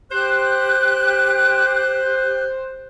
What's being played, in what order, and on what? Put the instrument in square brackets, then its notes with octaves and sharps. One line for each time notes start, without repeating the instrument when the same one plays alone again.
[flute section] G4 F#6 [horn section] C5